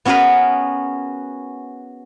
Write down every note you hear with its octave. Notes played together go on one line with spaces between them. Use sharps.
B3 C#4 F#4 G#4 A#4 B4